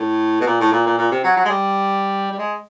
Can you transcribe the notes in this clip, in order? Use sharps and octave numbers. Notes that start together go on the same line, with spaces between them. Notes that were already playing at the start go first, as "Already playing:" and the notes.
Already playing: A2
B2
A#2
A2
A#2
A#2
A#2
C3
F#3
F#3
G#3
G3
G3
G#3